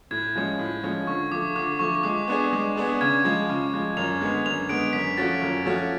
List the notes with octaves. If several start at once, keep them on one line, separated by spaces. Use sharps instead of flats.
A2 G#6
F3 G#3 C#4
A2
F3 G#3 C#4
D3 C#6
F3 A3 D6
D3 D6
F3 A3 C#6
C#6
G#3 D6
B3 D4 G#4
G#3
B3 D4 G#4
C#3 G#6
F3 G#3
C#3
F3 G#3
F#2 F7
D3 G#3 B3
F#2 F7
D3 G#3 B3 D7
F#2 B6
F3 A3 C#4 F#4 A6
F#2
F3 A3 C#4 F#4